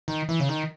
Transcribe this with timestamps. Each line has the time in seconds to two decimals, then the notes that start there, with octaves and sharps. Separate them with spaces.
0.08 D#3
0.29 E3
0.40 C#3
0.49 D#3